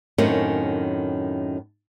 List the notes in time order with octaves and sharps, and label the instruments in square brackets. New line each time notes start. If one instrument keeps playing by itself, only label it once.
[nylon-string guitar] F#2 A2 D#3 A#3 C4 C#4